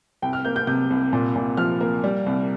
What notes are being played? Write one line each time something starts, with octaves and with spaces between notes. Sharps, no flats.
C2 G5
F6
A#3 G6
G6
C3 G6
C2
A#2
A#2
F3 F6
A#3
G3
C2